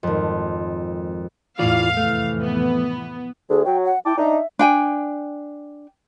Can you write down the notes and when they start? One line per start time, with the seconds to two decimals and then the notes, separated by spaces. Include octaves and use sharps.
0.03 G#1 F2
1.59 E2 A2 E3 F4 D5 F5
1.97 F1 A2 E3 A3
2.43 B3
3.50 D2 G#4
3.65 F#3 G5
3.85 F#5
4.05 E4 G5 A5 D6
4.17 D4 D#4 E5
4.59 D4 G5 G#5